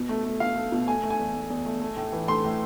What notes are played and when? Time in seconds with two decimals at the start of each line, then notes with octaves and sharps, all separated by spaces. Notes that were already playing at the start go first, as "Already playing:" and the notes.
Already playing: B2
0.09 A3
0.25 A3
0.40 B2 F5
0.56 A3
0.72 B2
0.87 A3 G#5
1.04 A3
1.10 G#5
1.19 E2
1.35 A3
1.50 E2
1.66 A3
1.82 A3
1.97 A2
2.12 E3
2.28 A3 C6
2.44 A2